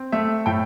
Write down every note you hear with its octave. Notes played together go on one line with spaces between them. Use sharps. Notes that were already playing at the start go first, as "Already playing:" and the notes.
Already playing: C4
A3 E5
A2 G5